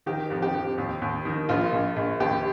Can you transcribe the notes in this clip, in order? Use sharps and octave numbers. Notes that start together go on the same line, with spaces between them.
D#3 G4
F2
G4
F2
D#2
D#2
D#3
A#1 F4
A#1
A#1
D#2 G4